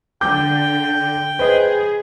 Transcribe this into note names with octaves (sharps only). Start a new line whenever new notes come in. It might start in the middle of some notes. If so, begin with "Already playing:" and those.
D3 G5 D6 G6
G#4 B4 C5 D#5